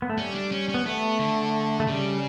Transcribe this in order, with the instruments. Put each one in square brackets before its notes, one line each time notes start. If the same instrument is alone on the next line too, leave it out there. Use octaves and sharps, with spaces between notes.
[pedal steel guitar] B3
A3
[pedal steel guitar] G3 [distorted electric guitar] C#4
[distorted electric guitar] D4
C#4
C#4
[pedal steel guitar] B3
[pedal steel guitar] A3 [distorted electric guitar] B3
[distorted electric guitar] D3
[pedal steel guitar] A3
[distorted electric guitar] C#3 [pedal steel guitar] G3